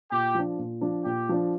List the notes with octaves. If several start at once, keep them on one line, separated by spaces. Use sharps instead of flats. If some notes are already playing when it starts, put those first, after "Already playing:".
A#2 G4
F3 D4
A#2
F3 D4
A#2 G4
F3 D4